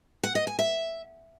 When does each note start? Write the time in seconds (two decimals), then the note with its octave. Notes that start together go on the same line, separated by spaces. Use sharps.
0.23 F#5
0.35 D#5
0.47 G#5
0.59 E5